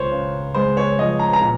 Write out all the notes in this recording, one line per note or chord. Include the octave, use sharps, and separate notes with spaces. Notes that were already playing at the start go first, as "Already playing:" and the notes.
Already playing: C#2 C5 C#5
C#3
G#3 C5
C#5
F3 D#5
A#5
A#5
A#2